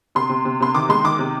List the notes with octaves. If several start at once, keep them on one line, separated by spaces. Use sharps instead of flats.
C3 C6
C3
C3
C3 C6
D#3 D6
G#3 C6
D#3 D6
C3